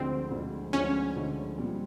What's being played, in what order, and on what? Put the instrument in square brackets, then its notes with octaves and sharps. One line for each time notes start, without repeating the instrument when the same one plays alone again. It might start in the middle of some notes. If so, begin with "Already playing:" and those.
Already playing: [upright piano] D2 D3 F3 G#3 [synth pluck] C4
[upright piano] D2 D3 F3 G#3
[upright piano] D2 D3 F3 G#3 [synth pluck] C#4
[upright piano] D2 D3 F3 G#3
A#2 G3 C4